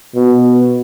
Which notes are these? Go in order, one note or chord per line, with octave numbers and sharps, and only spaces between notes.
B2